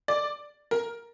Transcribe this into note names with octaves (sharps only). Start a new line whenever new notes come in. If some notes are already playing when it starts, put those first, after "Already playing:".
D5
A#4